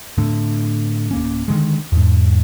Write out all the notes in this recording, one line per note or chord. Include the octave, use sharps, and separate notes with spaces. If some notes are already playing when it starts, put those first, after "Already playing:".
A2 D3
D1 A#3 C#4
D3 D#3 G#3
E2 G#2